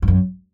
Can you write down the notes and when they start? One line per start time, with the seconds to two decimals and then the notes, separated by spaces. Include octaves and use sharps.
0.02 G2
0.08 F#2